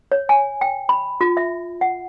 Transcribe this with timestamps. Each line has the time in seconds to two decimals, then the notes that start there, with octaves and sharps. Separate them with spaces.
0.12 C#5
0.29 G#5
0.61 G5
0.89 B5
1.21 F4
1.37 E5
1.81 F#5